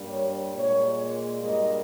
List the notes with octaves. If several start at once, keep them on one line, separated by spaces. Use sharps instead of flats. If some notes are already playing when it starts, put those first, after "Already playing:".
Already playing: G2 G3 A#3
C#5
A#2 G#3 C#5
G2 G3 A#3 D#5